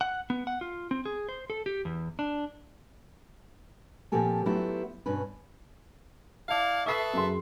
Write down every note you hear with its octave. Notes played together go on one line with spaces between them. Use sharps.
F#5
B3
F#5
F4
C4
G#4
C5
A4
G4
E2
D4
A#2 F3 C4 G4 A4 G#5
F#3 A3 B3 E4 F4 G4
G2 B2 C#4 B4
E4 D5 F5 A5
A4 B4 E5 C#6 D#6 C7
F#2 G#4 C6